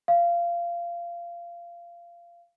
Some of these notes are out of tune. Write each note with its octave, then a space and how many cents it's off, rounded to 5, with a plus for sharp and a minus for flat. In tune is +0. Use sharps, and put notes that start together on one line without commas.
F5 -20